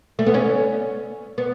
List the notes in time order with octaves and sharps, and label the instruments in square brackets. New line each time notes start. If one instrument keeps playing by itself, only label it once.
[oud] A3
B3
C#4
B3